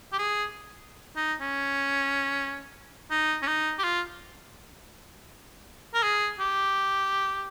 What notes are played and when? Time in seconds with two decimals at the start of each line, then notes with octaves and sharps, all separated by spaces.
0.13 G4
0.19 G#4
1.16 D#4
1.41 C#4
3.11 D#4
3.42 C#4
3.47 D#4
3.79 G4
3.84 F4
5.94 A#4
6.03 G#4
6.40 G4